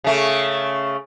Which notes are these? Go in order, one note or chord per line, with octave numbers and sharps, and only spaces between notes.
C#3 A3